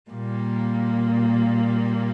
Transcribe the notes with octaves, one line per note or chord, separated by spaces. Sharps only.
A#2 G3 A#3